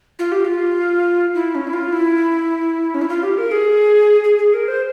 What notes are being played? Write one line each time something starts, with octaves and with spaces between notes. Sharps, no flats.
F4
G4
F4
E4
C#4
E4
F4
E4
C#4
E4
F4
G4
A#4
G#4
G#4
G#4
A#4
C5